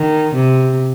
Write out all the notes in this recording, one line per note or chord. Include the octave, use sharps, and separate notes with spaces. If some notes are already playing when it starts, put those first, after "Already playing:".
Already playing: D#3
C3